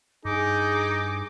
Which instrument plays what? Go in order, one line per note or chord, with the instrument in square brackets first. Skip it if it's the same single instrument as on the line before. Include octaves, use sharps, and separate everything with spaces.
[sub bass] G2 [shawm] D#4 [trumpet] G#4 [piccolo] D6